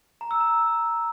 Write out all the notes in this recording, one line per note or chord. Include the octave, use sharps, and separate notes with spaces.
A#5
E6
A#5